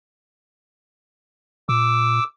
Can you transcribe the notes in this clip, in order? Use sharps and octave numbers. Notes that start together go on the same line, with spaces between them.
A#2 D6 E6